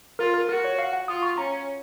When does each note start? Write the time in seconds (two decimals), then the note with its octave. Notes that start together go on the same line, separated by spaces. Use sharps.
0.19 F4 A#4
0.34 A#4
0.49 F#4 A#4
0.64 C#5
0.79 F5
0.93 F#5
1.08 F4 D#6
1.23 C#6
1.38 C#4 A#5